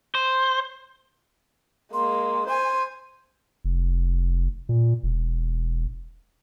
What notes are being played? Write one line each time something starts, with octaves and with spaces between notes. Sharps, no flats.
C5
G#3 A#3 C6
C5 G#5 C6
F1
A#2
E1